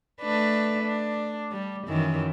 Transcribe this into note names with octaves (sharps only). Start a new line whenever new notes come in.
A3 D4 B4
D4
G3
F#2 D#3 E3